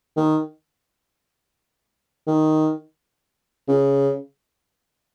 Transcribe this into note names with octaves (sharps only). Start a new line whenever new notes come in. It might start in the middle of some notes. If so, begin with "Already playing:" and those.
D#3
D#3
C#3